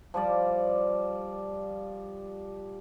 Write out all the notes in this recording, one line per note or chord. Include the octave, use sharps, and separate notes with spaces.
F3 G3 D5